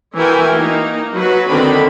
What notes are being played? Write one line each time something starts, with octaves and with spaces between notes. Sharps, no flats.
E3 E4 F#4 A#4 G5 G#5
A#3 D#4
F#3 F#4 B4
D3 D#3 C4 D4 B5